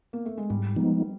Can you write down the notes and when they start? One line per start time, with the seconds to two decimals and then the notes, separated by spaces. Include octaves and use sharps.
0.13 A#3
0.25 A3
0.37 G#3
0.50 G#2 G3
0.76 F3 G#3 B3 D#4